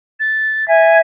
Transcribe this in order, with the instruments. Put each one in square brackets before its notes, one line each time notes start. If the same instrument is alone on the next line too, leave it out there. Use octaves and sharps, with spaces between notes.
[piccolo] A6
[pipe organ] E5 [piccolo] G#5